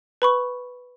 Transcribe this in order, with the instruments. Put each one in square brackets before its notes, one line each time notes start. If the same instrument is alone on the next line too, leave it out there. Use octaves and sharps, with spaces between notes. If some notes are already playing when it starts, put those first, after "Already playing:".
[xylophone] B4 B5 C#6